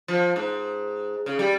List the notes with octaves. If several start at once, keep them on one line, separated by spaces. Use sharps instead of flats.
F3
G#2
C#3
G3